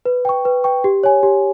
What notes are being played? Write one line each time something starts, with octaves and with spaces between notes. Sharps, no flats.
B4
G5 C#6
B4
G5 C#6
G4
C#5 G#5
G4